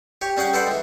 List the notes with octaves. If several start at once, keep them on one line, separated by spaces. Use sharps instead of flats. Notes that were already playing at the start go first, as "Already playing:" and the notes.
G4 C#5
G3 C#4 G#4 F#5 G5
A4 B4 C5 D5 F#5 G5
E3 G#3